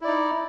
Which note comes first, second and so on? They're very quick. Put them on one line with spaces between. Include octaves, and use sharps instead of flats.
E4 D5 D#4